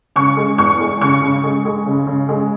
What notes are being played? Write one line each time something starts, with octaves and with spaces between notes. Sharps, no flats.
C#3 C#6
G#3
E2 C#6
G#3
C#3 C#6
C#3
G#3
G#3
C#3
C#3
G#3